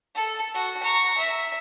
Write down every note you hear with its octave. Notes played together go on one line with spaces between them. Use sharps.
A4
F#4
A#5 C#6
E5